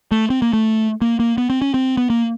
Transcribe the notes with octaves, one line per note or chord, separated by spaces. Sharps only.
A3
C4
A#3
A3
A#3
A#3
B3
C4
C#4
C4
B3
A#3